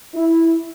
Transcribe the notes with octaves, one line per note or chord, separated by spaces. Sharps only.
E4